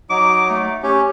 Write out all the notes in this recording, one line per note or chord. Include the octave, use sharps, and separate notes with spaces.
F#3 D#4 D6
A3
C#4 G4